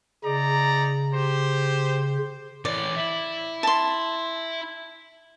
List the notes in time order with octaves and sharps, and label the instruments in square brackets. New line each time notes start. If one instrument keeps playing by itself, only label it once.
[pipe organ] C#3 [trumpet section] D#4 D5 A#5
[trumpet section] G4 C5
[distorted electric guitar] E3 C#4 [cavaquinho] D5
[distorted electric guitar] E4
[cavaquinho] A5 C6